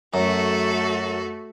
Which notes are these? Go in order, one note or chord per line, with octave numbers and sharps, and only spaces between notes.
F#2 A3 F#4 A4